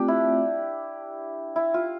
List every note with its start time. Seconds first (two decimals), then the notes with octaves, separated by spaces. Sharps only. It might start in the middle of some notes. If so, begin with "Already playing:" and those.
Already playing: A3 C4 D4 F4 G4
0.08 E4
1.56 E4
1.74 F4